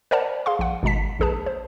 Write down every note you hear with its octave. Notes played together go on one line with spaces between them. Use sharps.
A#4 C5 D5 F#5 A5
G#4 F5 C6
A#1 F#5
G#1 B2 G#3 A5 B6
A#1 D#2 G#4 B4 A5
C5